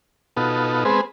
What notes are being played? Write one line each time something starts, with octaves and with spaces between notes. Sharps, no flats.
B2 B3 D#4 F4 F#4 A4
G#3 B3 C4 G#4 B4 C5